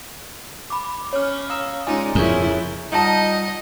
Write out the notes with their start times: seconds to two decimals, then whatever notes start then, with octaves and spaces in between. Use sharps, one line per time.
0.70 B5 D6
1.13 C#4 C#5 F6
1.50 F5 A#5 D#6 E6
1.87 G#3 C#4 D#4 F4 D5 G#5
2.15 F2 C#3 E4 G#4 A#4 C#5
2.92 G3 D#4 F4 D5 D#5 F#5 A5